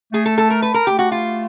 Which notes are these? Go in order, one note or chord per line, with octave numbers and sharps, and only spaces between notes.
A3 G#4
A4
A4
A#4
B4
A#4
A3 G4
F#4
F4